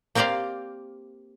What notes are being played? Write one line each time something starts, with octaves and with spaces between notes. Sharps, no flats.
A#3 C4 G4 C5 D5 F5